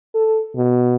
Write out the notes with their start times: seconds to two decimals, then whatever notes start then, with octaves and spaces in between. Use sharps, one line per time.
0.14 A4
0.56 B2